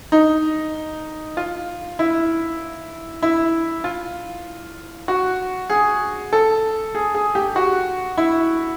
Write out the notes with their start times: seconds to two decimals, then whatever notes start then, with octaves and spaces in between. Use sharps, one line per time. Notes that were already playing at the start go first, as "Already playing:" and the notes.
0.12 D#4
1.37 F4
1.99 E4
3.22 E4
3.84 F4
5.08 F#4
5.70 G#4
6.33 A4
6.95 G#4
7.15 G#4
7.35 G4
7.56 F#4
8.17 E4